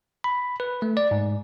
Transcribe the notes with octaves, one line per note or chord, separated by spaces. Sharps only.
B5
B4
A3
D5
G#2